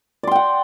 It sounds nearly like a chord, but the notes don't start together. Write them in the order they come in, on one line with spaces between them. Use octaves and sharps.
D5 C6 G5 F#5